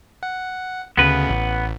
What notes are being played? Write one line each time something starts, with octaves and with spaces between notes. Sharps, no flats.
F#5
D2 C#3 B3 B4
A1